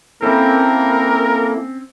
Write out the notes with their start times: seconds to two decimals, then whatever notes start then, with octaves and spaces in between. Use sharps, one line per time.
0.22 A#3 C4 C#4 E4 A4 A#4